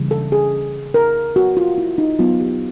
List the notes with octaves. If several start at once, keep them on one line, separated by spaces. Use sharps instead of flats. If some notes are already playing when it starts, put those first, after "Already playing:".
Already playing: C#3 E3 G3 A#3
A4
G#4
A#4
F#4
F4
E4
D#4
F#3 B3 F4
G4